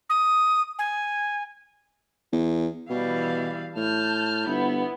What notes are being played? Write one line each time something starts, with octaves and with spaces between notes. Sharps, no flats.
D#6
G#5
E2
B2 E3 G3 F5
A2 A5 F6 G6
G1 B3 E4